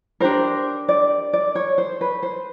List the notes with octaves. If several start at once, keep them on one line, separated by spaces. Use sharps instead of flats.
D4 G4 A#4 C5
D5
D5
C#5
C5
B4
C5